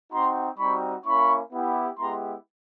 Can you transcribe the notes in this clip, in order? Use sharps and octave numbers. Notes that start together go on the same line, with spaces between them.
C4 D#4 F#4 A#5 C6
G3 C4 D#4 F#4 B5 C#6
A#3 C#4 E4 B5 C#6
B3 E4 G4
G#3 B3 E4 G4 A#5 C6